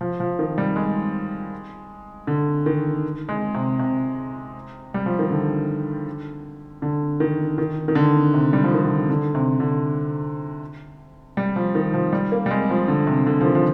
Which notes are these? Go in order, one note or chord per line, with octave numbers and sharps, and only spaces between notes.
F3
F3
D#3
G3
G#3
D3
D#3
G#3
C3
C3
G3
F3
D#3
D3
D3
D#3
D#3
D#3
D3
C3
G3
F3
D#3
D3
D3
C3
D3
G3
F3
D#3
F3
G3
A#3
G3
G#3
F3
D3
C3
D3
F3
D#3
F3